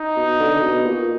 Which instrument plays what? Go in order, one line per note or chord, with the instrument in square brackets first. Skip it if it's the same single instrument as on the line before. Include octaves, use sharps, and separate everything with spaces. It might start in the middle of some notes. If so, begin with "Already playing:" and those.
Already playing: [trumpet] D#4
[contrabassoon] B2
D3
D3
B2
A#2